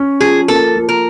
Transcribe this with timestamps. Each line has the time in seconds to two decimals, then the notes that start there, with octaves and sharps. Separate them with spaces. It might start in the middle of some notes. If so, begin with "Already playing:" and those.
Already playing: C#4
0.21 F3 G#4
0.48 A#3 A4
0.76 F3
0.89 A#4